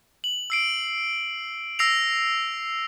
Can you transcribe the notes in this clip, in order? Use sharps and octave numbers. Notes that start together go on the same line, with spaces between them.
F#7
E6 C7 D7
E6 A#6 C7 F7